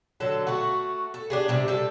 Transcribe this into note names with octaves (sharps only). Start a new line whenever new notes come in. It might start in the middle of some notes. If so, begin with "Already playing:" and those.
D3 F#3 A4
A3 F#4
A4
D4 G4 G#4
C3 G3 D4
G3 A4